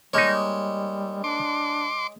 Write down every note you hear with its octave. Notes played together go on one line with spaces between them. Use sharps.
G3 G#3 A#3 D#4 C#5
D4 C6 D6